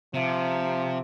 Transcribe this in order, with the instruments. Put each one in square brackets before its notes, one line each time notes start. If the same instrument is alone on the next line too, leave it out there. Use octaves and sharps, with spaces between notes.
[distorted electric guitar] C3 [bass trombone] F3 [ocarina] E5